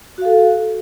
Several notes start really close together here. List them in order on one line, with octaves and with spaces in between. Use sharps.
F#4 F5 A4